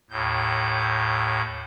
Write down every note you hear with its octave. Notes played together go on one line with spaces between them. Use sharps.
D#2 A2 G6